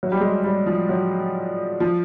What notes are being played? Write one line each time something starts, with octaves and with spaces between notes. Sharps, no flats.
F#3
G3
G#3
G3
F3
F#3
F3